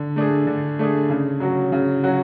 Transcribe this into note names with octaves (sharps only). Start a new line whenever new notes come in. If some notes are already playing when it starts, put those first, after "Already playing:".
Already playing: D3
A3 D4 G#4
D3
A3 D4 G#4
C#3
F#3 C#4 F#4
C#3
F#3 C#4 F#4